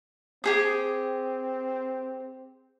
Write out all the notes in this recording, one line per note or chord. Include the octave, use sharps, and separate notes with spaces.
C4 G4 G#4 D#6